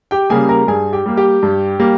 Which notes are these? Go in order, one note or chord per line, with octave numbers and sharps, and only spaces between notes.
G4 G5
C#3 G3 A#3 G#4 G#5
A#4 A#5
G2 G#4 G#5
G4 G5
G3 A#3
G4 G5
G2
G3 A#3